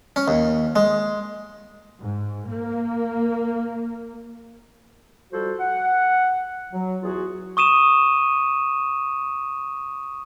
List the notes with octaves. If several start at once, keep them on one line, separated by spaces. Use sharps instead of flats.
C#4
D#2
G#3
G#2
A#3
F3 G3 F#4 A4 C5
F#5
F#3
E2 F4 F#4 G#4
C#6 D#6 D#7 E7